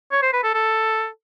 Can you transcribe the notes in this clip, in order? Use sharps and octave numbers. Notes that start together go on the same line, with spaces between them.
C#5
C5
B4
A4
A4